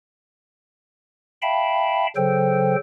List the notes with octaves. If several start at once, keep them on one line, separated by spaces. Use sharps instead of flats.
E5 F5 G5 A5 B5
C#3 F#3 A4 C5 G5